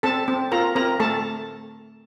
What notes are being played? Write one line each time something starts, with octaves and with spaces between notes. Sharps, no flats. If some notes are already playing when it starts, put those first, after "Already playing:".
C4 A4 A5
C4
F4 A#4 A#5
C4 A#4 A#5
A3 A4 A5